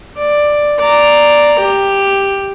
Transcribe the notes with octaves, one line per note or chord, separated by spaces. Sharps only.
D5
D5 A#5
G4